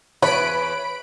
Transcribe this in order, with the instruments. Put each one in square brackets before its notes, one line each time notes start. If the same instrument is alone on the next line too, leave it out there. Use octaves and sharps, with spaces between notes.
[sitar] E2 [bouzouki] B4 [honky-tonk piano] C#5 [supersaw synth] B5 D7